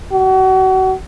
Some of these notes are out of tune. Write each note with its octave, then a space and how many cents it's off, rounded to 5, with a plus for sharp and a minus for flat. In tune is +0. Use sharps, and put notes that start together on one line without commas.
F#4 +35